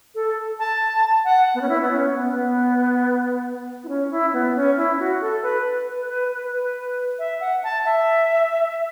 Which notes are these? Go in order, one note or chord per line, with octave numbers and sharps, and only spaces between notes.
A4
A5
F#5
B3
C#4
E4
B3
C#4
B3
B3
E4
C#4
E4
B3
C#4
E4
F#4
A4
B4
B4
B4
B4
B4
E5
F#5
A5
E5